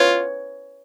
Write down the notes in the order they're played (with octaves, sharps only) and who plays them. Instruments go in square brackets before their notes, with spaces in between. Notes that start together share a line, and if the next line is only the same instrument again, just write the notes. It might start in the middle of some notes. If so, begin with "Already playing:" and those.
Already playing: [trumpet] F4 [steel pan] B4 C#5